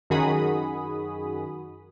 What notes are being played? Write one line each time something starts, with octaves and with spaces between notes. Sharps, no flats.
F#2 D#3 F#4 G#4 B5 D#6